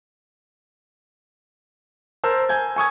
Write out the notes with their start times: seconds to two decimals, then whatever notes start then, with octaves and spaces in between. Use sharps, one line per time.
2.24 A#4 C5 A5 E6
2.49 G#5 G6 G#6
2.76 G#5 C#6 D#6 G#6